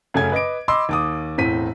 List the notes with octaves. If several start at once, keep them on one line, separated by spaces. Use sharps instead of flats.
F#2 C#3 A3 C#4 G#5 G#6
B4 D#5 D6 D7
D#5 B5 C6 D6 E6
D#2 D6 D#6
E1 A2 C4 B6 D#7